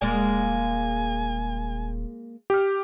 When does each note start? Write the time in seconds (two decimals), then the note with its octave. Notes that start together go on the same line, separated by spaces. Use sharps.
0.02 D#1 G#3 A#3 D5 G#5
2.50 G4 F6